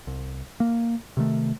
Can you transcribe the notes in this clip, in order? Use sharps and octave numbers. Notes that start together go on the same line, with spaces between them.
C2
A#3
C3 D#3 A3